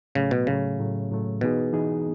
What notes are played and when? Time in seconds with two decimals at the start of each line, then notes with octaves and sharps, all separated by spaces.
0.15 A2 C#3 F#3 A3
0.31 B2
0.47 A2 C#3 F#3 A3
0.79 A2 F#3 A3
1.11 A2 F#3 A3
1.41 B2 E3 B3 D#4 G#4
1.73 E3 B3 D#4 G#4